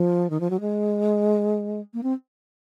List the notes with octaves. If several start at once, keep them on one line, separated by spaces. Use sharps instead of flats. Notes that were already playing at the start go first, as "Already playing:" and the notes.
Already playing: F3
D#3
F3
F#3
G#3
A#3
C4